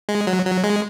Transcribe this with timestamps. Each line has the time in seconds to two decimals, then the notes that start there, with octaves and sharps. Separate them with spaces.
0.09 G#3
0.27 F#3
0.45 F#3
0.64 G#3